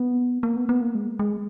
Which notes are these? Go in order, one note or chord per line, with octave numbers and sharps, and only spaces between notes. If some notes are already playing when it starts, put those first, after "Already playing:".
Already playing: B3
A#3
B3
B3
A#3
G#3
G#3